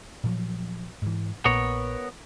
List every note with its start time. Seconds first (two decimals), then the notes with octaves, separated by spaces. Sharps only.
0.24 A#2 F3 F#3
1.02 G#2 E3
1.45 A#1 A#2 B3 A#4 C#5